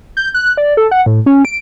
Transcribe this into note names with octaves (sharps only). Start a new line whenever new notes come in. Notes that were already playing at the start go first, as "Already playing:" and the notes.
G6
F#6
D5
A4
F#5
A2
C#4
D7